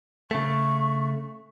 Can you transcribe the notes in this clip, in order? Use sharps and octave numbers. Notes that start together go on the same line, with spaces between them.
C#3 A3 C#6